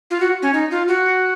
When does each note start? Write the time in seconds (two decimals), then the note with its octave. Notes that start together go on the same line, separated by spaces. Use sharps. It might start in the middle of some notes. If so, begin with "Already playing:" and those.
0.11 F4
0.20 F#4
0.42 C#4
0.54 D#4
0.71 F4
0.88 F#4